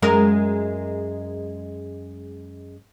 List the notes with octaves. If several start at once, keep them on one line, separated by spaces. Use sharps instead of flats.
F#2 G#3 A#4